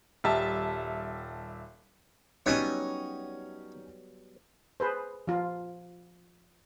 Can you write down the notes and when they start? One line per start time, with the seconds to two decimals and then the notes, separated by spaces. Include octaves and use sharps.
0.24 D#1 G3 E5 A5
2.46 F#3 G3 B3 C#4 D#4 C#5 D#5 G#5
4.80 G#4 B4 C5
5.27 F3 F4